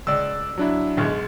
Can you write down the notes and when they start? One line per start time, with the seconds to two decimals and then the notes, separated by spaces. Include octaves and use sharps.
0.07 C#2 D5 E6
0.58 F#3 D4 E4
0.97 B1 F#2 G#3